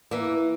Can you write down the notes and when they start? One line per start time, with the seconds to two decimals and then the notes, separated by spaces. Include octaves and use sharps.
0.11 E3 A#3